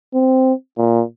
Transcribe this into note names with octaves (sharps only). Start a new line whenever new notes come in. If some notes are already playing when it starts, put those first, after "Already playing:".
C4
A#2